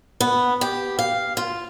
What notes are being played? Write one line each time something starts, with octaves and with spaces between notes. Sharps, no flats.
B3
G4
F5
F4